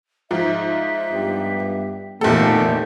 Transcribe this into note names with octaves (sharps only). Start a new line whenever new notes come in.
G#2 F3 E5
G2 B3 G4
F1 A#2 D#3 E3 A3 B3 G4 A4